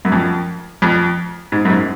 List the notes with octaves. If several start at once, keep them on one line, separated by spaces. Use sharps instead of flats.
F#2
F2
F2
G#2
F#2
G#2